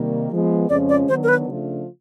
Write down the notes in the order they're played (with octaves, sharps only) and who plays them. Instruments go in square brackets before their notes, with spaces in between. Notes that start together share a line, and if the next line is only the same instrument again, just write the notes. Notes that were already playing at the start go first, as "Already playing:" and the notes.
Already playing: [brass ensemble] C3 D#3 G3 A#3
F3 G#3 B3
[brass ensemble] F2 C#3 F3 G#3 C#4 [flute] D5
[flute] D5
[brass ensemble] D#3 F#3 B3 D4 [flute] C5
[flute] A#4
B4
[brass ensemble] C#3 F3 A3 D4 F4